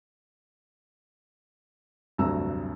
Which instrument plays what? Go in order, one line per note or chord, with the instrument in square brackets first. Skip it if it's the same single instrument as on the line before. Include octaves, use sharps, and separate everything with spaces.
[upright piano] F1 D2 G2 F#3 A#5 E6